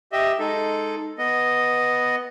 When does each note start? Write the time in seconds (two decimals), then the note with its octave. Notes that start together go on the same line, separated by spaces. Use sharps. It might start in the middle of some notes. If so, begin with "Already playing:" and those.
0.12 G4 D#5 E5
0.39 G#3 D#4 A4
1.18 B3 D#5